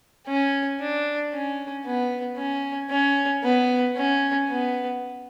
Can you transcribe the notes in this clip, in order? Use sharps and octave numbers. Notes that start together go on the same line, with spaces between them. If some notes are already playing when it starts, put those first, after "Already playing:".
C#4
D4
C#4
B3
C#4
C#4
B3
C#4
B3